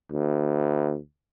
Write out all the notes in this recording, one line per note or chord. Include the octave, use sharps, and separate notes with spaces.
D2